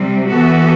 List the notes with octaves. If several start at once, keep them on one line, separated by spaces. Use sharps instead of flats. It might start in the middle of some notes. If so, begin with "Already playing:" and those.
Already playing: C3 G3 C4
E3 B3 F#4 A4